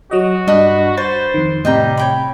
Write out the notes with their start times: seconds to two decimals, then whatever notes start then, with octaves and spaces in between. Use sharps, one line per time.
0.11 F#3 F#4 D#5
0.47 G2 D4 B4 D#5 D#6 F#6
0.97 B4 C5 A6
1.34 F2 D#3
1.65 A2 C3 G3 D#5 G5 A#5
1.97 C#5 G5 B5